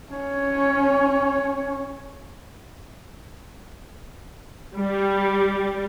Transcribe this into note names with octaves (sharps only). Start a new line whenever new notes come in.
C#4 C#5
G3